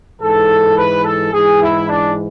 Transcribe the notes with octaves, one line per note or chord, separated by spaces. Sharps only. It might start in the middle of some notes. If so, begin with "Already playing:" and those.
G#2 E3 A4
B4
A4
G#2 E3 G#4
E4
D4